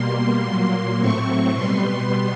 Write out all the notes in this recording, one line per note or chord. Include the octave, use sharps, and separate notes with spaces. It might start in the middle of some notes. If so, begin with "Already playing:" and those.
Already playing: B2 G3 A#3 C6
A#2 F#3 A#3 C6
A2 F#3 A3 C4 C#6
B2 G3 B3 C6